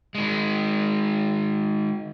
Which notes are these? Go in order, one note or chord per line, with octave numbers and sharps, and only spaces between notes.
D#3 G#3